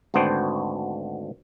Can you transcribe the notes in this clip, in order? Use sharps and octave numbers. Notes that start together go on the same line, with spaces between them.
G#1 D2 B3 D4 C5 G5